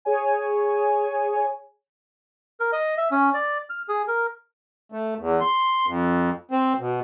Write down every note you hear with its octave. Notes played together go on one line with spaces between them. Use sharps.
G#4 C#5 G#5
A#4
D#5
E5
C#4
D5
F6
G#4
A#4
A3
E2
C6
F2
C4
B2